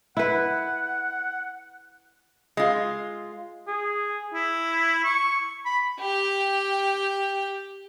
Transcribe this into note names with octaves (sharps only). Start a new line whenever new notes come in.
E4 B4 F#5
G#3 F4
G#4
E4
C#6
B5
G4 G5